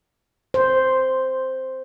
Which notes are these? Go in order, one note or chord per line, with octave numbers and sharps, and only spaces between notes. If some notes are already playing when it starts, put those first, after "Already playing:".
C5